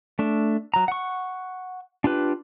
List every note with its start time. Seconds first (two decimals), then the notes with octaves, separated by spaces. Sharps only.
0.19 A3 D4
0.74 F#3 A#5
0.88 F#5 C#6
2.04 D4 F4 G4 B4